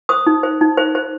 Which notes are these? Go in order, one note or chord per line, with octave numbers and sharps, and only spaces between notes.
C5 D#6
D#4
C5
D#4
C5
C5